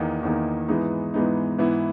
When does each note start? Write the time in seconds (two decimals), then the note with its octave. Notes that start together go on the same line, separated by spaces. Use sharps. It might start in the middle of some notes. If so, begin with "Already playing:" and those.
Already playing: E2 D#3 A#3 D#4
0.23 E2 D#3 A#3 D#4
0.68 G#2 E3 G#3 B3 D#4
1.14 G#2 E3 G#3 B3 D#4
1.58 G#2 E3 B3 E4